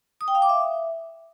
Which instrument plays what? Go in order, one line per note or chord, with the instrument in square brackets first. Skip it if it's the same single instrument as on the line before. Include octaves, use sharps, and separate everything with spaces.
[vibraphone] D#6
G5
F5
D6
E5